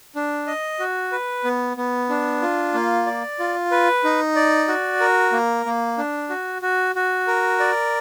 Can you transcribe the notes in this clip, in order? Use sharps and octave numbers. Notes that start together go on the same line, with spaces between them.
D4
D#5
F#4
B4
B3
B3
D4
F4
A#3
D5
F4
B4
D#4
D5
F#4
A#4
A#3
A#3
D4
F#4
F#4
F#4
A#4
D5